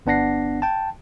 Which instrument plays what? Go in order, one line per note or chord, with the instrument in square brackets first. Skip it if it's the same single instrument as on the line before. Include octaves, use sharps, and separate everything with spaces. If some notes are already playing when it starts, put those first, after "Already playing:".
[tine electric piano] G1 B3 D4 F#5 A#6 C7
G5 A5